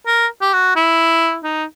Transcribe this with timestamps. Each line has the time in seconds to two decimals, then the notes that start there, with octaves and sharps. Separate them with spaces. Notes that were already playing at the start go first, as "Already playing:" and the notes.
0.06 A#4
0.41 G4
0.53 F#4
0.76 E4
1.44 D#4